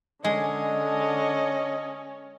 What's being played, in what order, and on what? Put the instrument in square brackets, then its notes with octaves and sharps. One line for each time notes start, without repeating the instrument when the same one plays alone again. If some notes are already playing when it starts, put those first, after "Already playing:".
[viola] D3 [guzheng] G#3 [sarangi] C#4 [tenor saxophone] D#5